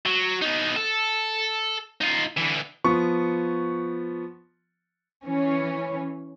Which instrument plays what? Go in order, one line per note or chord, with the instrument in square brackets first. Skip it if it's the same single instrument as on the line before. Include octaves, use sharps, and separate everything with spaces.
[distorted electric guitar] F#3
B3 D#4
A4
D#4 F4
D3 E3
[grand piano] F3 B3 C#6
[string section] E3 C#4